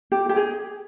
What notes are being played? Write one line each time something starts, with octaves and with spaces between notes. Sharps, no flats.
G4
G4
G#4